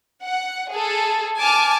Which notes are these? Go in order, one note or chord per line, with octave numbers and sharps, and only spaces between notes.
F#5
G#4 A4
G#5 A5 D6 F6